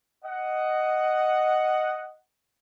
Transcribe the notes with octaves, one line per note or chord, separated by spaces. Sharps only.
D#5 F#5